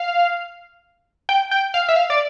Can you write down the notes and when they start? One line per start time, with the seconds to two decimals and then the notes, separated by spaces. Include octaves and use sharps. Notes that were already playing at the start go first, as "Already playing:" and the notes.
Already playing: F5
1.29 G5
1.51 G5
1.74 F5
1.88 E5
1.96 F5
2.10 D5